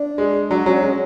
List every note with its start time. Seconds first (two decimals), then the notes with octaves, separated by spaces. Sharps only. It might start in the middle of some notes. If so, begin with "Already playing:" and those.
Already playing: D4
0.18 G#3
0.50 F#3 D4
0.66 F#3 C#4
0.82 G#3 C#4